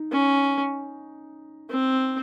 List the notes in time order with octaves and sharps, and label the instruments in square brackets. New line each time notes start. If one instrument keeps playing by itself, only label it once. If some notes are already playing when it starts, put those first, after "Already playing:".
Already playing: [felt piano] D#4
[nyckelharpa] C#4
C4